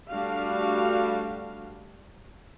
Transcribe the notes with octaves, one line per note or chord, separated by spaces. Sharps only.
G3 A3 D4 F#4 F5